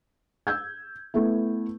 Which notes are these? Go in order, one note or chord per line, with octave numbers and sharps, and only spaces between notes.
E6 G6 G#6
A3 B3 E4